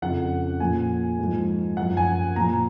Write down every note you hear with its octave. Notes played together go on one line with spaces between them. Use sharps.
F2 C#3 F3 F#5
A#2 F3 G#5
G#2 F3
F#2 F3 F#5
G#5
A#2 F3 A#5